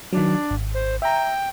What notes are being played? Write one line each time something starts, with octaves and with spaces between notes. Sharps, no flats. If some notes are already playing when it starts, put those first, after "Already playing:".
D#3 F#3 D4
G#1
C5
E5 G5 A#5